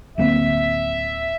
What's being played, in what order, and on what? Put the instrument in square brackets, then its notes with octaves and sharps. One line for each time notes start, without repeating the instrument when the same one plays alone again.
[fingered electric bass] D1 A#3 C4 [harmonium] E5